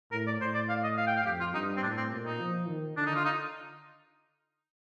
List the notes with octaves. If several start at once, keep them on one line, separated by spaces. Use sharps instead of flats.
A2 A#4
D5
A2 C5
D5
F5
D#5
F5
G5
F5
F2 G4
F4
G2 D#4
C4
A2 D4
C4
A#2
D#4
F3
D#3
D3 D4
D#4
F4
D#4